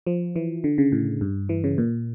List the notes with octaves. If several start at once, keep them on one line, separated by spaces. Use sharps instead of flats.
F3
E3
D3
C#3
A2
G2
E3
C#3
A#2